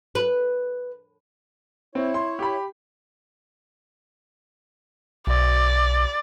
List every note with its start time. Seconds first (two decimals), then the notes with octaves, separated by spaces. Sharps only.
0.15 B4
1.95 C4 E4 C#5
2.14 C6
2.39 G4 B5
5.27 B1 D5